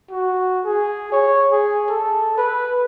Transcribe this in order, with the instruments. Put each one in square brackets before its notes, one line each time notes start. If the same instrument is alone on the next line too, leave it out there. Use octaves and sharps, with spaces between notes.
[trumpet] F#4
G#4
C#5
G#4
A4
B4